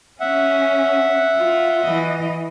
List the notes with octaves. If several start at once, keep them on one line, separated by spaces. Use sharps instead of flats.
C#4 E5 F#5
F4
E3 D#5